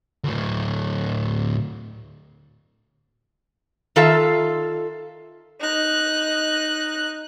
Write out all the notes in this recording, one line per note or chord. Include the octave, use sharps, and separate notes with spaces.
D2 A2
D#3 F4 A4 E5 F5
D#4 F#6